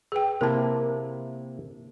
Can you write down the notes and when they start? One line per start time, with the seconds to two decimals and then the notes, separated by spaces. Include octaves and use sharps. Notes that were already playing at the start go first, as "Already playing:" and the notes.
0.12 G#4 B4 G5
0.41 C3 A#3 E4 A#4 A5